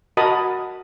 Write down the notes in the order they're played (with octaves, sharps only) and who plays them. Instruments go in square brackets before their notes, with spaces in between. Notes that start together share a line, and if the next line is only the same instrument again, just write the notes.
[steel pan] F#4 A#4 D#5 A5 B5 D#6